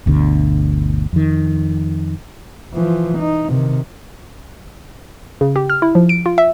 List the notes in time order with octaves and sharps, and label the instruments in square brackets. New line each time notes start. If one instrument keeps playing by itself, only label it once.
[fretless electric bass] G1 D2 B2 D3
F2 D#3
[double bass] E3 F3
D#4
C3 D#3
[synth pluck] C#3
G4
F6
E4
F3
D7
F4
E5